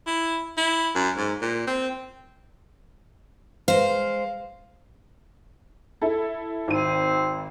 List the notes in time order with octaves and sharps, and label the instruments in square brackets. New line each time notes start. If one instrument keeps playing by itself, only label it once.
[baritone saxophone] E4
E4
F#2
G#2
A#2
C4
[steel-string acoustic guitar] G#3 C5 [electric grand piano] F5
[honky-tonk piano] E4 A4
[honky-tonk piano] G#1 D#7 [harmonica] C4